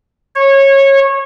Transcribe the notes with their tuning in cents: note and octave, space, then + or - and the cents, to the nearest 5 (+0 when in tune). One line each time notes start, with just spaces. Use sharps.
C#5 -20